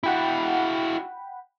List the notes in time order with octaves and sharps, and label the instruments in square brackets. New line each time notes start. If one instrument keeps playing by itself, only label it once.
[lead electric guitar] E4 F#4 [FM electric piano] F#5 G5 B5